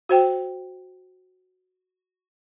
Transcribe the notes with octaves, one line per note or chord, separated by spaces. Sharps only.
F#4 C5 G5